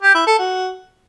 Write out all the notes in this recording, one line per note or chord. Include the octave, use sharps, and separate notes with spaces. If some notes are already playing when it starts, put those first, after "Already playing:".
G4
E4
A4
F#4